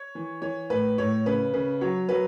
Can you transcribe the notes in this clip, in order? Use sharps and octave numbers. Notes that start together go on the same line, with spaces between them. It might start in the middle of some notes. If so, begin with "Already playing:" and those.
Already playing: C#5
E3
E3 C#5
A2 B4
A2 C#5
C#3 B4
C#3 B4
F#3 C#5
F#3 B4